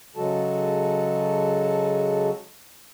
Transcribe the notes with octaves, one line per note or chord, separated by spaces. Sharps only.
C#3 F#3 G#3 F#4 A4 A5